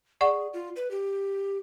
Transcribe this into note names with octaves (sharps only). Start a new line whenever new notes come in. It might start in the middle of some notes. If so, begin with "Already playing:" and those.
G#4 D5 F#5 C#6
F4
B4
G4